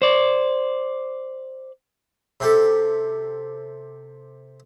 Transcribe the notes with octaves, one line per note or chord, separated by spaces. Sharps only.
C5 D5
C3 G4 A4